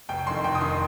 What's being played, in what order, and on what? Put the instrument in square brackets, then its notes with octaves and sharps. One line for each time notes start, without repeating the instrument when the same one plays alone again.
[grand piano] F1 G5
F2 D#3 C6
F1 G5
D#6
D#3 C6